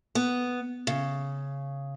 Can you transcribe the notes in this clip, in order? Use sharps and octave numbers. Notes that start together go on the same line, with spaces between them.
B3
C#3